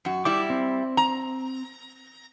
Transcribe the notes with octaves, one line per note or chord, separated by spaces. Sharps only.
F#2 F#4
G3 E4 D6
C4
A#5